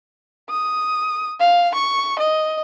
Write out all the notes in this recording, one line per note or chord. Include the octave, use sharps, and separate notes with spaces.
D#6
F5
C#6
D#5